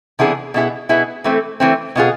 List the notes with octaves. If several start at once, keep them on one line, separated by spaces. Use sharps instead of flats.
C3 E3 B3 D4 G#4
B2 B3 E4 G#4
B2 B3 E4 G#4
E3 A3 C4
E3 A3 C4
B2 B3 F4 G#4